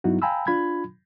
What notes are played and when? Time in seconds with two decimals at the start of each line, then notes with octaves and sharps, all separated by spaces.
0.04 G2 F#3 B3 D#4 E4 F#4
0.22 F5 G5 G#5 A#5 B5 E6
0.47 D4 F4 B5 G#6